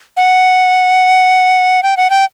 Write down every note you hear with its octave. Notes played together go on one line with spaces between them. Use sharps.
F#5
G5
F#5
G5